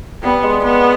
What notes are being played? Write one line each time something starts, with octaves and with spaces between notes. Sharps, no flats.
G3 B3
G#3
B3